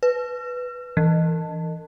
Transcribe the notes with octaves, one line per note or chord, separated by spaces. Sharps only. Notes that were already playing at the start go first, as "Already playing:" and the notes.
B4
E3